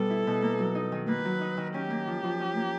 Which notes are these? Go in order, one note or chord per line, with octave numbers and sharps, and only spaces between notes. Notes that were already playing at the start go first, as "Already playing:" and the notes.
Already playing: B2 G3 B3 A4
E4
B2
A#3
F#3
D#4
D#3
A#3 B4
F#3
D#4
D#3
C#4 G4
A#3
F3
F3
C#4
A#3